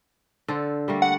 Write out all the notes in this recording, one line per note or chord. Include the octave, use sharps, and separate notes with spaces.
D3 A4 C5
G3 A3 A#3
F#5